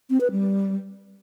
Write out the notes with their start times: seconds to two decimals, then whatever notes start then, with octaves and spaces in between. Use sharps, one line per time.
0.10 C4
0.21 B4
0.31 G3